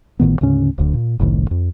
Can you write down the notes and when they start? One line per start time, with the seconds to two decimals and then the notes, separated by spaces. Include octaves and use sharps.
0.20 A1 A2 D#3 B3
0.41 D2 G#2 C#3 C#4
0.78 D1 D2 D3
0.94 A#2
1.19 F#1 C2 A2 D#3
1.51 F2